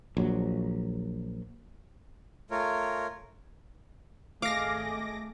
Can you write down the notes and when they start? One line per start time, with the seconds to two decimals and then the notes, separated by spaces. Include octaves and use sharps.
0.17 A#1 F#3
2.51 A3 F4 A#4 C#5
4.42 G#1 A3 G#4 D#5 F5 D6 A#6